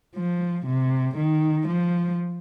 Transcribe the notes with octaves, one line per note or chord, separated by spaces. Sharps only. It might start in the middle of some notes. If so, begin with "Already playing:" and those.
F3
C3
D#3
F3